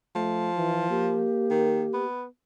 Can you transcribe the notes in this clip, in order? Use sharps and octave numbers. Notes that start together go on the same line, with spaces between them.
F3 A3
E3 F4
A#3 G4
D#3
B3